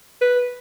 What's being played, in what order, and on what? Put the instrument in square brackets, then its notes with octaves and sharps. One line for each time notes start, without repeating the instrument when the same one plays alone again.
[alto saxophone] B4